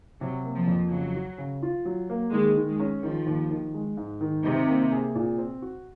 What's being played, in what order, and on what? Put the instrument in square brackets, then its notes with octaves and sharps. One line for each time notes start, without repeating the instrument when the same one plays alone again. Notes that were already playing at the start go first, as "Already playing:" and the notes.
[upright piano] C3 [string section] F#3
[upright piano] A#3
[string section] F3
[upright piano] F2
[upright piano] C#3 [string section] F#3
[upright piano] F#4
C#3
F4
F#3
A#3
[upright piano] D#3 [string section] G#3
[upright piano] D#3
[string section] G#3
[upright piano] C#4
[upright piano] D#3 [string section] F3
[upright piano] D#2
D#3
G#3
G#2
D#3
[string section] C3 [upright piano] D#4
[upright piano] A#3
G#4
A#2
C4
F#4